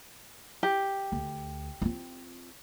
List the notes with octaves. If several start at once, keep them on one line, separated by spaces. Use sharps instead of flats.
G4
D2
C4 F4